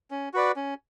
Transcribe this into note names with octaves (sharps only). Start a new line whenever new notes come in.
C#4
F#4 B4 D5
C#4